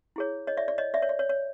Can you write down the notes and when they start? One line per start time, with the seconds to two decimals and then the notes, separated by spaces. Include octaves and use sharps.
0.16 E4 G#4 C#5
0.47 C#5 D#5
0.57 D5 E5
0.68 D5
0.78 C#5 D#5
0.94 D5 E5
1.02 C#5
1.09 D5
1.19 C#5
1.30 C#5